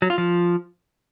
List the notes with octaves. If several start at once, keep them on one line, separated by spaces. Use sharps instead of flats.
F#3
F4
F3